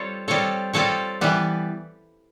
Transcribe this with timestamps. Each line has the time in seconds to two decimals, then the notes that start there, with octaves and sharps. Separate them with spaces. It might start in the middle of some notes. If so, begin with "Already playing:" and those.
Already playing: G3 C4 F4 A4 C#5
0.28 G3 C4 F4 A4 C#5
0.73 G3 C4 F4 A4 C#5
1.21 E3 G3 B3